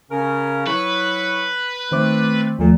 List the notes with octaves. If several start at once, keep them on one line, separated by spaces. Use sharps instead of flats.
C#3 C#4 A#4
F#3 E4 B4 C#6
D#3 A3 C4 C5 D6
D#2 A#2 F3 A3